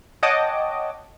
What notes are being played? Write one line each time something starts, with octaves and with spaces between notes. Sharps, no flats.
C#5 D#5 F#5 G5 A5 D6